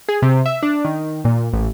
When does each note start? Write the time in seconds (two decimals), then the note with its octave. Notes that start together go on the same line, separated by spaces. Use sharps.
0.09 G#4
0.22 C3
0.46 E5
0.63 D4
0.85 D#3
1.25 A#2
1.53 A1